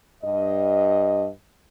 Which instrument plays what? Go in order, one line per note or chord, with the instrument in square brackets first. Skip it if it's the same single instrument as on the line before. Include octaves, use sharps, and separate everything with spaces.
[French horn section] G2 D#5